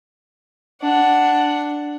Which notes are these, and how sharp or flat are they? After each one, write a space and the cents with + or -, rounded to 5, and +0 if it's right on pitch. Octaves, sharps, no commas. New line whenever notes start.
D4 +0 F#5 +5